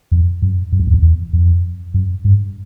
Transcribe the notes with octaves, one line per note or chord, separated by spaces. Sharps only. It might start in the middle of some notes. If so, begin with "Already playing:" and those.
F2
F#2
F#2
F2
E2
F2
E2
F2
F#2
G2